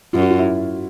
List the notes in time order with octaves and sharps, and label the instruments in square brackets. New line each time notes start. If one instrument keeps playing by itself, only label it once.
[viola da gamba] F#2 [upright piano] F4
[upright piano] F#4
F4
E4